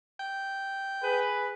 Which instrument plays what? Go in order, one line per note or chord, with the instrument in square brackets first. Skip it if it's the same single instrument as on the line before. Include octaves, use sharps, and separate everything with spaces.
[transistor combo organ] G5
[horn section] G#4 B4